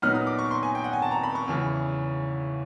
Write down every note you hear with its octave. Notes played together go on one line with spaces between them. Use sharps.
A#2 F#3 B3 D#4 F6
D#6
D6
C#6
C6
G#5
G5
F#5
G#5
A5
A#5
B5
C#6
E2 C#3 E3